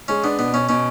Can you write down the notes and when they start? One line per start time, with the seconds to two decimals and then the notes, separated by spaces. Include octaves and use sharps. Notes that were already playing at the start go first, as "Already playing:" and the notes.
0.08 G#3 C#4
0.24 B3 D4
0.39 B2 B3
0.53 B2 C#4
0.69 B2 C#4